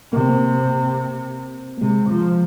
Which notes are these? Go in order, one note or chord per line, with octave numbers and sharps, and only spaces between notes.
C3 A#3
C4
A#3
A#3
C3 G#3
F3